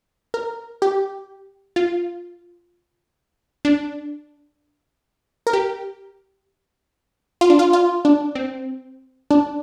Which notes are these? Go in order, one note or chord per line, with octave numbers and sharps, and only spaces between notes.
A#4
G4
F4
D4
A#4
G4
F4
D4
F4
F4
D4
C4
D4